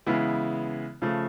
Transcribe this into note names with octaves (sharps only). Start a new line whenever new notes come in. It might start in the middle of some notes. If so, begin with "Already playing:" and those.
C#3 E3 G#3 B3 E4
C#3 F3 A3